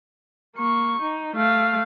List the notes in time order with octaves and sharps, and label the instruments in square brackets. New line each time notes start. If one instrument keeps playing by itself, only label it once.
[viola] A#3 C#6
D#4
A3 F5